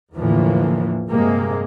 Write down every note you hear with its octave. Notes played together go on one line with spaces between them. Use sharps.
E2 A2 D3 E3 F3 A#3
G2 C3 G#3 A#3